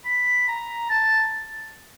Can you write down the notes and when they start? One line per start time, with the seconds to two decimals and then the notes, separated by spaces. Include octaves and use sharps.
0.05 B5
0.48 A#5
0.90 A5